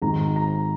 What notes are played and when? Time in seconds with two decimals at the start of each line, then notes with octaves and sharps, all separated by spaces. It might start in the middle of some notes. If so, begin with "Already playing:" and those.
0.02 G#1 G#2 D#3 A#5
0.36 A#5